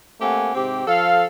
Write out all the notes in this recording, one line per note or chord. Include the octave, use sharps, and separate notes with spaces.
A3 A#3 C4 G4 F#5 G#5
G#2 C3 C4 G4
F3 A4 F5